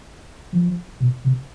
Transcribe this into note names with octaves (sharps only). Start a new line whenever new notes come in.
F3
B2
C3